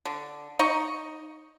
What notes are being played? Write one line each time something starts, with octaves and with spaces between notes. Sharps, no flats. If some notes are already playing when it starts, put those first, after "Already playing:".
D3
D#4 D#5 C#6